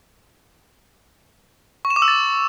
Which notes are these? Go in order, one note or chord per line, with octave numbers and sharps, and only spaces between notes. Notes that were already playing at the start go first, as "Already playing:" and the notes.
C#6
E7
D6
E6
A6